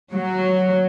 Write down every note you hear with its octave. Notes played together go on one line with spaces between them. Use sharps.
F#3